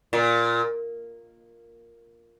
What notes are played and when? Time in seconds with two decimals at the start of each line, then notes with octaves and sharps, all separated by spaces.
0.13 A#2